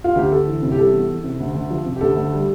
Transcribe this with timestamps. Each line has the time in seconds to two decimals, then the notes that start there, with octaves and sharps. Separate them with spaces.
0.04 F4
0.15 D2 G4
0.32 D2 A4
0.47 E3
0.62 C3
0.71 G4
0.78 G3 A4
0.93 E2
1.08 E3
1.24 C3
1.40 D2
1.55 D2
1.70 F3
1.85 C3
1.96 G4
2.01 D2 A4
2.16 D2
2.33 G3